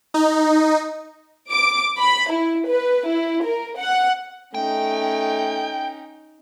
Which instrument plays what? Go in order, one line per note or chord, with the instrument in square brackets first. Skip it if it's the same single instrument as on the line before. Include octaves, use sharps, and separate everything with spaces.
[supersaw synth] D#4
[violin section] D6
B5
E4
B4
E4
A#4
F#5
[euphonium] A3 [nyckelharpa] C#4 D#4 [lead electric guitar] G5